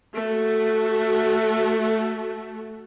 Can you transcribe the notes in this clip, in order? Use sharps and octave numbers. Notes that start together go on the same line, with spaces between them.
A3 F#4